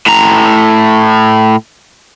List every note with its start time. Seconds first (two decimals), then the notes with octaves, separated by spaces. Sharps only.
0.06 A2 A#5